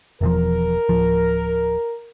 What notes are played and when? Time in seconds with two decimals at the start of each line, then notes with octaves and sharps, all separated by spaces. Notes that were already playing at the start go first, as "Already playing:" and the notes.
0.21 E1 E2 F3 A#4
0.89 D1 F3